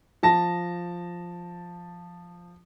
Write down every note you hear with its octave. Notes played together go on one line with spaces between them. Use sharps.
F3 A5 A#6